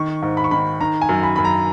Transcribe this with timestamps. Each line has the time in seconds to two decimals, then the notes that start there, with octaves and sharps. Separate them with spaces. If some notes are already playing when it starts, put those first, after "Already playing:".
Already playing: D#3 C#6
0.22 G#2
0.37 B5
0.44 C#6
0.51 D#3 B5
0.81 D#3 A#5
1.02 G#5
1.09 F#2
1.23 B5
1.36 F#2 B5
1.45 A#5